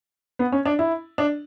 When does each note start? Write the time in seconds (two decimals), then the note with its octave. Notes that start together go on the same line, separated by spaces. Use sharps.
0.39 B3
0.52 C#4
0.65 D4
0.79 E4
1.18 D4